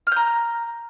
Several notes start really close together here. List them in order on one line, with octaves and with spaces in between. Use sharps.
F6 G6 A#5